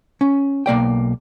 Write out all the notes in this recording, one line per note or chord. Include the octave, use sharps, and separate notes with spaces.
C#4
B1 A#3 D5 G5